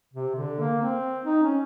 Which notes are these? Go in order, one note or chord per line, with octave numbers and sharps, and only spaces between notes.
C3
D3
A#3
C4
D#4
C#4